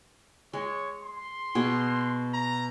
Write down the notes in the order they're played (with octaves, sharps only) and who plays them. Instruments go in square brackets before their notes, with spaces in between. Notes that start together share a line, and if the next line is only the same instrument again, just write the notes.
[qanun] G#3 [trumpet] C#5
[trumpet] C6
[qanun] B2 G#4
[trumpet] A#5